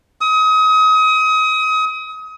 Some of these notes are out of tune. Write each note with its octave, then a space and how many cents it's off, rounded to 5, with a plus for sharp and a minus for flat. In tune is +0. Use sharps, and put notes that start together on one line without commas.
D#6 +30